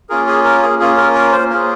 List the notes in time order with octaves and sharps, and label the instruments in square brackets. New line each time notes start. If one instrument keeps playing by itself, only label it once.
[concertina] A#3 C#4 F4 G#4 A#4
G#4
A#4
G#4
A#3 C#4 F4 G#4
A#4
A#4
C5
A#3 C#4 F4 G#4 A#4